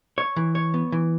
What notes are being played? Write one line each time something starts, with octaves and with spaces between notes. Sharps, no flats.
C#5
E3
C#5
B3
E3